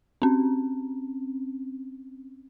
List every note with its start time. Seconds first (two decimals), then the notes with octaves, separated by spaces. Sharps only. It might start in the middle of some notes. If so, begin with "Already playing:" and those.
0.22 C4 C#4